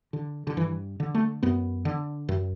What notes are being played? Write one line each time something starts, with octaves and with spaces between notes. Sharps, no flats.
D3
D3
G2 E3
D3
A3
F#2 B3
D3
F#2